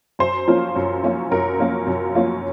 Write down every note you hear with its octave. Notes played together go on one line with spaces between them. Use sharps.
F#2 C5
F3 A#3 C#4 F4
F#2
F3 A#3 C#4 F4
F#2 A#4
F3 A#3 C#4 F4
F#2
F3 A#3 C#4 F4